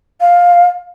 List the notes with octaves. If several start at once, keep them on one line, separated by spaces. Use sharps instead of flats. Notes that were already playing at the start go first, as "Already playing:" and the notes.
F5